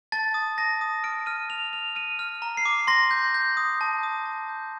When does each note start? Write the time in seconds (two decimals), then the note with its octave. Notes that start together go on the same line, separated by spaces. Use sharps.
0.12 A5 A6
0.34 D#6
0.58 A5 A#6
0.81 D#6
1.04 F6 D7
1.26 F6 D#7
1.49 F6 F7
1.73 F6 F7
1.95 F6 D#7
2.19 F6
2.42 A#5
2.57 C7
2.65 D6
2.87 C6 A#6
3.11 G6
3.34 G6
3.57 D#6
3.81 A5
4.03 D#6
4.26 A5
4.49 G6